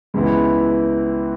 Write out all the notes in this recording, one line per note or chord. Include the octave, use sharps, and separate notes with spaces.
C#2 C#3 E3 B3 E4